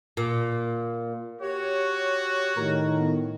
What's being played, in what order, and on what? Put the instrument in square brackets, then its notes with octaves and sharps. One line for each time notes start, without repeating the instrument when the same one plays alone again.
[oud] A#2
[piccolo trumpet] F#4 [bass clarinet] G4 [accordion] C#5
[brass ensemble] A2 D#3 [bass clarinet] A#4
[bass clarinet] B3